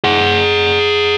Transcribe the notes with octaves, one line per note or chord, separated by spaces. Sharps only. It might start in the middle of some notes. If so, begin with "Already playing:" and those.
G#4 F#5